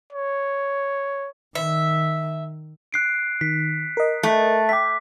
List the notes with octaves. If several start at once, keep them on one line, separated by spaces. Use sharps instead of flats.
C#5
D#3 E5
F#6 C7 D7
D#3 B6
A#4 D#5
A3
E5 G5 D6 B6